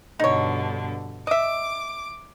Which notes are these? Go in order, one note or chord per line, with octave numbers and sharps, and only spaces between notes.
G2 B2 D3 D#4 C#5
D#5 E5 D6